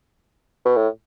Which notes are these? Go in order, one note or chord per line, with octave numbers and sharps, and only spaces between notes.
B2
A2